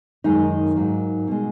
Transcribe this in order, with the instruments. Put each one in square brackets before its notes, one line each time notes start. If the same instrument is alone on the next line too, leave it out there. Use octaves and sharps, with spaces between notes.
[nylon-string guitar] F#2 D#3 G#3 D#4
G#2 F#3 A#3
B2 G#3